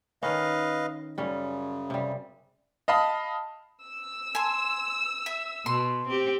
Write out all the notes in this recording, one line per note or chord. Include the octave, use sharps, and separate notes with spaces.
D#3 C#4 B4 D#5 F5
F#2 C#3 G3 C#4
C3 G3
D#5 F5 A5 B5 D#6
E6
G#5 C6
E5
B2 C6
C4 G4